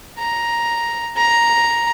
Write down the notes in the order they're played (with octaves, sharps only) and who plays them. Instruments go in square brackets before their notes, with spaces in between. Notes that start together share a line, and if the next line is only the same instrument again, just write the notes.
[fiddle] A#5
A#5